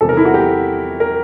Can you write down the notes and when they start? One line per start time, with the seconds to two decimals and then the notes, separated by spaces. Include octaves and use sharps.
0.01 E2 C3 D#3 G3 A4
0.09 A#4
0.17 E4
0.25 F#4
0.34 G4
1.00 A#4